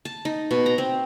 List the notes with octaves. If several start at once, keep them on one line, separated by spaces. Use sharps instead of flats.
A5
D#4
B2
A#5
C4